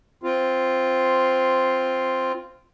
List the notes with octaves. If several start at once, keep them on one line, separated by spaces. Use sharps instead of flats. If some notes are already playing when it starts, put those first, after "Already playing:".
C4 F4